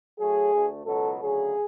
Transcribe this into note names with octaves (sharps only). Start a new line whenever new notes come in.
A2 F#3 A3 G#4
D2 D3 A3
C#2 B2 F#3 A4
D2 C#3 F#3 G#4